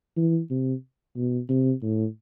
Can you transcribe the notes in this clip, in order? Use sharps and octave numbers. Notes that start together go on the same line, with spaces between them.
E3
C3
B2
C3
A2